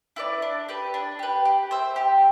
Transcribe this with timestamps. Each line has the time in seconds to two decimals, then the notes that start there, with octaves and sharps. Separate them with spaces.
0.16 E4 B4 D5
0.42 D4
0.69 G4 B4
0.94 D4
1.19 G4 B4
1.45 G4
1.71 C5 E5
1.96 G4